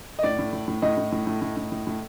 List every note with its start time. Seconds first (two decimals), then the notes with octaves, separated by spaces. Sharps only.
0.19 D#5
0.23 A2 D5
0.39 A2
0.53 A2
0.68 A2
0.82 A2 D#5
0.97 A2
1.12 A2
1.27 A2
1.42 A2
1.57 A2
1.72 A2
1.87 A2